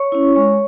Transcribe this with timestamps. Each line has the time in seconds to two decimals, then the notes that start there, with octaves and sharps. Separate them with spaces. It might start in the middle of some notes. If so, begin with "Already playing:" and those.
Already playing: C#5 C#6
0.12 C#4 E4
0.35 G#3 C#5 C#6